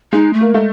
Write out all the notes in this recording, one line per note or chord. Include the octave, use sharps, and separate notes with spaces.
G#3 D#4
A3
A#3
G#3 A3